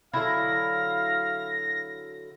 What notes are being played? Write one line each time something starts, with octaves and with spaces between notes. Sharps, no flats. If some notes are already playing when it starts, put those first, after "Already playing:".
D3 F#3 E4 F5 A#6